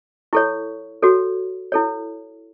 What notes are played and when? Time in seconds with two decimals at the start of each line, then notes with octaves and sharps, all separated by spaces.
0.33 E4 A4 C#5 C#6
1.02 F#4 A4 C#5
1.72 E4 A4 C#5